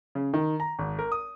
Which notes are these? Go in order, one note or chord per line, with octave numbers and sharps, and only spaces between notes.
C#3
D#3
A#5
G#1
A#4
D#6